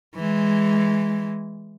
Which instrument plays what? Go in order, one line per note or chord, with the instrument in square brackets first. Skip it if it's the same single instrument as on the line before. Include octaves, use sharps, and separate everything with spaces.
[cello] E3 G#3